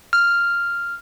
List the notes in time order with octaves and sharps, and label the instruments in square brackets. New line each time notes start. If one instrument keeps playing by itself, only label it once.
[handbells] F6